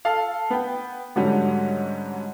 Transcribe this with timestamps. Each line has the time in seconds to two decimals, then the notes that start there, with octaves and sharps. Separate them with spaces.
0.05 A4 F5
0.50 B3 G5
1.16 G#2 D3 F#3 G3 C#4